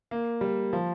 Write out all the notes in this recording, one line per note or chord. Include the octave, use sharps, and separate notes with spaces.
A#3
G3
F3